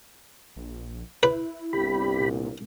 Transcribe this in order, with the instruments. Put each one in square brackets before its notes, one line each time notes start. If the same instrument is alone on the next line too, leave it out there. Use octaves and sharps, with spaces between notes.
[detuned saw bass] A#1
[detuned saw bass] E4 [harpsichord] B4
[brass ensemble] G1 C2 [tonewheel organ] G4 B5
[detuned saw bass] A#2